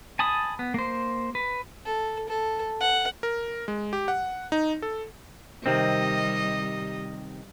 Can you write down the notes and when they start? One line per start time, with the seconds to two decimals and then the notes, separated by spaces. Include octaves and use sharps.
0.19 G#5 A5 B5 D#6
0.59 B3
0.74 A#3 C5
1.35 B4
1.85 A4
2.28 A4
2.81 F#5
3.23 A#4
3.68 G#3
3.93 G4
4.08 F#5
4.52 D#4
4.82 A4
5.66 C3 D#3 G3 C4 D#5